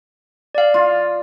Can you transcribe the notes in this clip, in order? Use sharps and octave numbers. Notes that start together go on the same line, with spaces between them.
D5 F5
F4